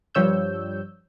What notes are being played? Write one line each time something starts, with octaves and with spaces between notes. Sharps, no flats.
G2 F3 G3 C#5 E6 G6